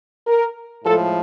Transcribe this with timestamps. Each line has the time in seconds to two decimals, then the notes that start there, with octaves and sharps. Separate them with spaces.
0.27 A#4
0.84 A2 F3 G#3 A4